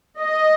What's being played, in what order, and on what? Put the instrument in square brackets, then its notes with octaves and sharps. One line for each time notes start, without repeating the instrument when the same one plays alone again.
[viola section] D#5